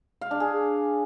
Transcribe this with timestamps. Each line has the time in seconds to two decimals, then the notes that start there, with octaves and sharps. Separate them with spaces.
0.21 F5
0.31 D4
0.40 G#4